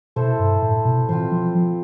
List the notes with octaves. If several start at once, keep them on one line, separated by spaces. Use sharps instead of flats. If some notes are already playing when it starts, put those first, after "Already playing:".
B2 A3 E4 A4 C5
G2
A2
B2
E3 C4 F4 C5
F3
F3